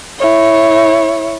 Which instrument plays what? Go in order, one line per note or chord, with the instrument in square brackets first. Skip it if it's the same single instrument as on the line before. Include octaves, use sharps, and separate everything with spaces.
[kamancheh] E4 C#5